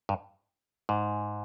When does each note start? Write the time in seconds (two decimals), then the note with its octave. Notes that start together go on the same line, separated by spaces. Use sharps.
0.09 G2
0.89 G#2